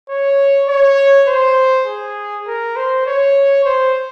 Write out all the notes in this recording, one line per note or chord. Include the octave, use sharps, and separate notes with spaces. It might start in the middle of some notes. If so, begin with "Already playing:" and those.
C#5
C#5
C5
G#4
A#4
C5
C#5
C5